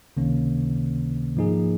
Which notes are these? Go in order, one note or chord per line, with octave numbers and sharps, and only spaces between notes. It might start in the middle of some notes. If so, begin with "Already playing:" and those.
C#2 C3 D#3 A#3 C#4
G#2 F3 A#3 D#4 G#4